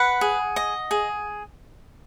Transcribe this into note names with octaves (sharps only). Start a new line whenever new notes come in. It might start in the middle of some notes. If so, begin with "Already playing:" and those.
Already playing: B4 F#5
G#4
D#5
G#4